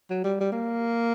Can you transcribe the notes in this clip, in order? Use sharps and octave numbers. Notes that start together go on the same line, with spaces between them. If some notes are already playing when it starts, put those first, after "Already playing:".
F#3
G3
G3
A#3